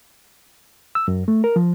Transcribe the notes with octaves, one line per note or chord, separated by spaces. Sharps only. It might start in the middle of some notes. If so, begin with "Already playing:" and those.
E6
F#2
A3
A#4
F3